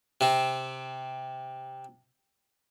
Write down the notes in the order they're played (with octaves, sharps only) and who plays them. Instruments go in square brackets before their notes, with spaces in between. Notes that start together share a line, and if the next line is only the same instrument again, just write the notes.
[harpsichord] C3 C4